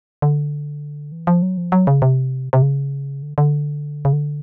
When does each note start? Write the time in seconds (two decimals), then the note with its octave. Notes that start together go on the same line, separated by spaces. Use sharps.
0.22 D3
1.12 E3
1.27 F3
1.42 F#3
1.58 F3
1.72 F#3
1.87 C#3
2.02 C3
2.53 C3
2.62 C#3
3.22 D3
3.38 D3
4.05 C#3
4.13 D3